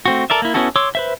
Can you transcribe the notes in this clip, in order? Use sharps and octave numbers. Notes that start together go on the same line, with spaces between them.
A3 C4 F#4
A4 A#4 D5 E5
A#3 E4
B3 C#4 E4 F#4 A4
C#5 C6 D6 E6
B4 C5 E5